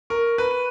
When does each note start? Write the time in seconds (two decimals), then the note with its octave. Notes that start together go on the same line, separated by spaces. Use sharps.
0.10 A#4 C#6
0.38 B4
0.51 D#7